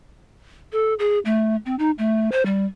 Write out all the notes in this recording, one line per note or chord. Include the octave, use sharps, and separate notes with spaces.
A4
G#4
A3
C4
D#4
A3
C5
G3